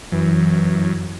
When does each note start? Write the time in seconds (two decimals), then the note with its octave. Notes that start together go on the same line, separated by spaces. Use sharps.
0.12 F#2 E3